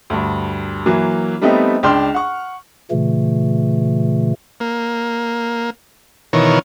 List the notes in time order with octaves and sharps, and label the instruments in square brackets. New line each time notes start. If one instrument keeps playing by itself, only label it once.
[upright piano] D2 G2
E3 F#3 A#3
G3 A3 B3 C4 D#4
C#2 D4 G5 C6 F6
F#5 C#6
[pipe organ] A#2 C#3 E3 A3
[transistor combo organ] A#3
B2 D#3 E3 A#4 C#5